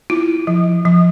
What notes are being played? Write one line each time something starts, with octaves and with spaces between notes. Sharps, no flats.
E4 F4
F3
F3